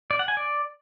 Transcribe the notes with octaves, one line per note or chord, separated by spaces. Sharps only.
D5
F#5
G#5
D5